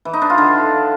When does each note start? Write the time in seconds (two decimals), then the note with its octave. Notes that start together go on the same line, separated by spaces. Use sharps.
0.05 E3
0.13 D#4
0.22 D4
0.30 F4
0.38 D3